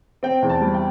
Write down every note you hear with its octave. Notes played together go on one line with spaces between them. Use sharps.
C4 G5
E2
A5
G3
G5